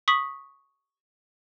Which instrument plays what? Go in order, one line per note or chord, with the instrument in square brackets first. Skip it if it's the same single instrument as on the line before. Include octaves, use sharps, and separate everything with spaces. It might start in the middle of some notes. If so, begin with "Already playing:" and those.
[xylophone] C#6 D#6 B6 F#7